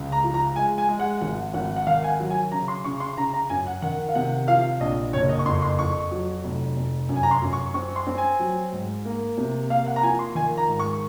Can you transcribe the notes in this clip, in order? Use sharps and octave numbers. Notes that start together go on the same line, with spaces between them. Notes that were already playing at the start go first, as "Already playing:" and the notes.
Already playing: C#2
A#5
F3
A#5
G#3 G#5
G#5
G#3
F#5
G#1 F#5
G#1 F#5
F#5
D#3 F5
G#5
F#5
F#3
G#5
C#3 A#5
C6
C#3 C#6
C6
C#3 A#5
A#5
F#2 G#5
F#5
D#3 F#5
F5
C3 F#5
F3 F5
A#1 D#5
F#1 C#5
D#5
C#6
F2 C6
C6
F2 C#6
F#3
F1
F1
F#2
G#5
A#5
C6
F#2
C#6
C4 C#6
C6
C4
G#5
F#3
G#2
A#3
C3
A#3 F5
F#5
A#5
F3 G#5
C6
D#3 G#5
A#5
G#2
C#6